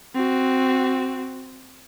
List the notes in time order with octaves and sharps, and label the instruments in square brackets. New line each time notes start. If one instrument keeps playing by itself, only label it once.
[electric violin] C4 F#4